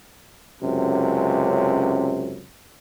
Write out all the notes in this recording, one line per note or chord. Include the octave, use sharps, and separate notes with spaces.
C#2 F#2 C3